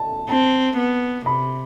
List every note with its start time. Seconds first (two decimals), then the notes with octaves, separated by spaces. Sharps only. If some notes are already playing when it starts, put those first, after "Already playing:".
Already playing: A5
0.29 C4 A5
0.77 B3
1.26 C3 B5